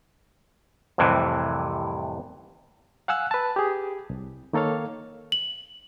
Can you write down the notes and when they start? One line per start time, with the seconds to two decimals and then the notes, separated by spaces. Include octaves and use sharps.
0.98 C2 F2 A2 C3 E3
3.08 F5 F#5 G#5 E6 F#6
3.31 B4 A5
3.56 G4 G#4
4.10 C2
4.53 D#3 A#3 A4 C#5 F5
5.32 F#7